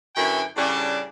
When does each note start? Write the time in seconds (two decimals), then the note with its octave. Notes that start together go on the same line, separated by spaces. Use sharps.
0.16 F#2 D3 E4 B4 G5 G#5
0.57 A2 C#3 G3 D4